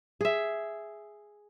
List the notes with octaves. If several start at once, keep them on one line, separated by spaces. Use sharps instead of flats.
G#4 E5